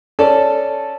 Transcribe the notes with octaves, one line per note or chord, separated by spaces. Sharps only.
C#4 A4 D5 A5